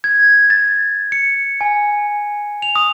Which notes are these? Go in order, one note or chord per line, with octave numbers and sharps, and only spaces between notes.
G#6
A6
C#7
G#5
F7
D#6